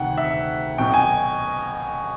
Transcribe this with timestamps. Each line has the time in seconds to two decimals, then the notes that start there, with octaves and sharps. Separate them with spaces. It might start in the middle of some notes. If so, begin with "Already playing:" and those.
Already playing: D2 C3 D#3 F#5 G5
0.18 E5
0.78 B1 B2 G5
0.94 G#5